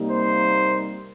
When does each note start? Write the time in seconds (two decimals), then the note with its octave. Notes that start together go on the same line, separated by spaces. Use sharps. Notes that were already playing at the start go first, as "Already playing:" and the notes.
Already playing: C3 G3 A#3 D#4
0.10 C5